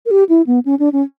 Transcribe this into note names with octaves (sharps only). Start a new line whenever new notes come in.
A#4
G4
E4
B3
C#4
D4
C#4